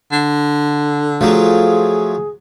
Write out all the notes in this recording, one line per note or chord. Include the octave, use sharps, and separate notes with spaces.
D3
F3 F#3 A3 F4 G#4